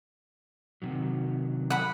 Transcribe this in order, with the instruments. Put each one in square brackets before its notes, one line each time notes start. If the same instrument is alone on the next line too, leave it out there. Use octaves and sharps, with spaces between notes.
[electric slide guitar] C3 D#3 F#3
[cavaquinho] F#5 B5